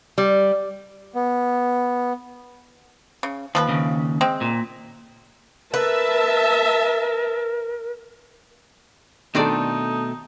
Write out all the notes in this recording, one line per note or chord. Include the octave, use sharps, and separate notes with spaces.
G3
B3
C#3
D#2 F3 A4 B4
D#2 C#3
G#3 C4
A#2
A#4 B4 E5 A5
B2 D#3 A3 C4 D4 D#4 A4 D5